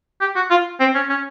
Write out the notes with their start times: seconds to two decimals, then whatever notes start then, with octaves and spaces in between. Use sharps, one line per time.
0.21 G4
0.36 F#4
0.50 F4
0.80 C4
0.95 C#4
1.09 C#4